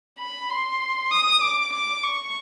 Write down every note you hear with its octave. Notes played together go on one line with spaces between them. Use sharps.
B5
C6
D#6
D6
D6
C#6